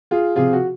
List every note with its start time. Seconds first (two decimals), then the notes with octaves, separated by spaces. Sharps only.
0.11 F4 G#4
0.36 C3 F3 F4 G#4
0.53 F#4